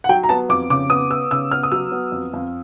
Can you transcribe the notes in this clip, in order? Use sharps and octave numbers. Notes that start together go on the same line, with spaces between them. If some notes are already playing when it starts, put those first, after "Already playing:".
F#5
F#3 G5
A#5
B3 A5
F2 D6
C#3 D6
B3 D#6
B3 E6
C#3 E6
B3 F6
D#6
F#3 E6
B3
F2
F2